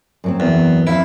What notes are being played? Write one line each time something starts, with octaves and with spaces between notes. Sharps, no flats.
F#2 F#3 C4
E2
F2 E4 E5 F5